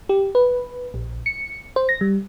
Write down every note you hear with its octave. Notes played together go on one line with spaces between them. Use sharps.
G4
B4
A#1
C#7
C5
A#6
G3